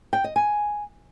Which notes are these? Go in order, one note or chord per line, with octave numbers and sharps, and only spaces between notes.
G5
D#5
G#5